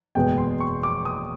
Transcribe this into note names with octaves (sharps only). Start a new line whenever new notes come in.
F#1 E2 B2 G#3 B3 G5
C6
C#6
D6
D#6